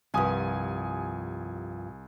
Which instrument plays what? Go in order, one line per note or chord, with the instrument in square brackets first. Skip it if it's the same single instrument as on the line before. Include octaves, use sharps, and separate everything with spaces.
[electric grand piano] C2 G#5 D#6 [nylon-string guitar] G2 F3